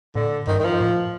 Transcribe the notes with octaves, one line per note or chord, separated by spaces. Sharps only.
A2 D3
G2 D#3
D#3
F3
A2